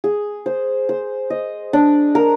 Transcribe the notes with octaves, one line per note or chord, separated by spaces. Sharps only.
G#4
C5
C5
D#5
D4
A#4